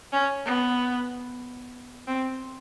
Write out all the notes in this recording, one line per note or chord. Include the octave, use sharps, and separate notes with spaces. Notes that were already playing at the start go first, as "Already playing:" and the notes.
C#4
B3
C4